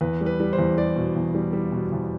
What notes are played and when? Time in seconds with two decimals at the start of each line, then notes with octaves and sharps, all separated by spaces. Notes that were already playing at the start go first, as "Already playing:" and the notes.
0.01 E2 B4
0.21 G3
0.26 B4
0.40 G3
0.53 C5
0.58 E2
0.78 G3 D5
0.96 B2
1.16 E2
1.35 G3
1.53 G3
1.72 B2
1.92 E2